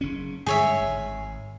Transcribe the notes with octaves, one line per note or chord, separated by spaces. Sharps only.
F#1 C#3 C#4
G2 D3 G#3 G#4 C#5 E5
G#1